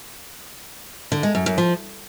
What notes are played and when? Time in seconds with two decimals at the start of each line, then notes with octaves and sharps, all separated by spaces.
1.12 D3
1.23 G#3
1.35 F#2
1.46 F#2
1.58 F3